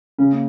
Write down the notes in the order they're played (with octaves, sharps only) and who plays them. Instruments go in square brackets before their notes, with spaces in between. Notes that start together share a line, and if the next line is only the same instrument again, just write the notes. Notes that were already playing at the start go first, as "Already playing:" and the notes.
[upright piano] C#3 [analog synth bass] C#4
[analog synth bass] A#3